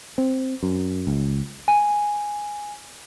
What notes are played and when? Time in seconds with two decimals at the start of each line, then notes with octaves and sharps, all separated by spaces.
0.18 C4
0.63 F#2
1.07 C#2
1.68 G#5